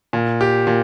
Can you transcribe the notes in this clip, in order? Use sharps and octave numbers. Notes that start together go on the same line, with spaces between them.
A#2
G4
A#2